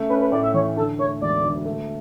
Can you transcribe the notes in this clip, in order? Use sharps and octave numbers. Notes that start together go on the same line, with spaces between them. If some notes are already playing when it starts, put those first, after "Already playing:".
Already playing: C#3 A3
C#4 B4
B4
A2 D5
E5
E3 C#5
D3 A4
A3 C#5
E1 D5
D2
A3